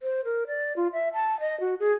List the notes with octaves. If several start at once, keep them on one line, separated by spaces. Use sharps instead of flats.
C5
A#4
D5
F4
E5
A5
D#5
F#4
G#4